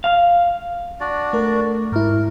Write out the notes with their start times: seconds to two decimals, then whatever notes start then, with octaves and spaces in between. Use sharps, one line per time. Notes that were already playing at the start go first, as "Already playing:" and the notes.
0.04 F5
1.00 D4 F#4 D5
1.33 A3 A#4
1.92 G#2 E4 A#4